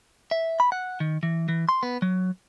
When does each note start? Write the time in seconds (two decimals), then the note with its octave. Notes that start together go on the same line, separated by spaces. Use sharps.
0.31 E5
0.60 B5
0.72 F#5
1.00 D#3
1.23 E3
1.48 E3
1.69 C6
1.83 B3
2.02 F#3